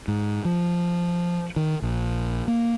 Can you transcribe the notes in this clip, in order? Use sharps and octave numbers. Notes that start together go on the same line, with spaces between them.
G#2
F3
D#3
A#1
A#3